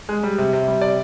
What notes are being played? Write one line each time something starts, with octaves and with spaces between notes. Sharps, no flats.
G#3
G3
C3
C3
G3
C3 D5